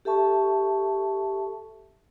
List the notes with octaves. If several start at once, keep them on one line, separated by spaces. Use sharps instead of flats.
G4 A4 E5 A5 C#6